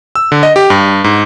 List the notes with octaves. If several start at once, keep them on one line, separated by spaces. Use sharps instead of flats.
E6
D3
D#5
G4
G2
G#2